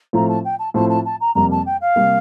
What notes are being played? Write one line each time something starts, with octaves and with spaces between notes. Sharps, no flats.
A2 F3 A3 C4 F4 A#5
A5
G5
A5
A2 F3 A3 C4 F4 A5
A5
A5
A#5
F2 C3 G3 A#3 A#5
A5
G5
F5
C3 G3 A#3